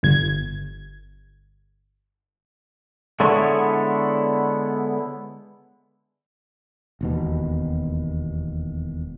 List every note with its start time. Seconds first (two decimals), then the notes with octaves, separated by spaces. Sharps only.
0.03 G1 G#6
3.20 D3 G#3 B3 E4 A4 C#5
7.01 E1 D#2 B2